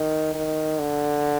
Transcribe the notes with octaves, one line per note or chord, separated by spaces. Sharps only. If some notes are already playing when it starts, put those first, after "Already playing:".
Already playing: D#3
D#3
D3